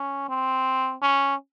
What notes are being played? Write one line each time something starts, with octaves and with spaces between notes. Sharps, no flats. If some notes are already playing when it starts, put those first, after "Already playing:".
Already playing: C#4
C4
C#4